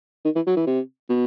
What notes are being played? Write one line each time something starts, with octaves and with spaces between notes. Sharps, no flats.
D#3
E3
F#3
E3
C3
B2